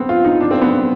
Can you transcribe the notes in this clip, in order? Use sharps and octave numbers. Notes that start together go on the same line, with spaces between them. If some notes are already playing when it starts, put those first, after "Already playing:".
Already playing: B3 C4
F4
D#4
D4
C4
B3